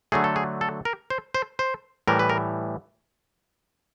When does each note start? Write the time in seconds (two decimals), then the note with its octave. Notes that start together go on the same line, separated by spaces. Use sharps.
0.12 D3 F#3 A3 G#4
0.24 A4
0.36 G#4
0.61 A4
0.85 A#4
1.10 C5
1.34 C5
1.59 C5
2.08 A2 E3 G3 A#4
2.19 B4
2.29 A#4